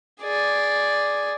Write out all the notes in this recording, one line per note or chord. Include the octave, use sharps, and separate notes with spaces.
G#4 D5